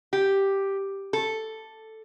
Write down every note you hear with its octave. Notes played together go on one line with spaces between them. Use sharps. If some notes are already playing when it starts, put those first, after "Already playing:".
G4
A4